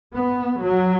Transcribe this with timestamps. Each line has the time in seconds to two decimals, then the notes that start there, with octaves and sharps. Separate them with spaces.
0.14 B3
0.60 F#3